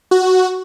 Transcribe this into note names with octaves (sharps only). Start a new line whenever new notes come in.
F#4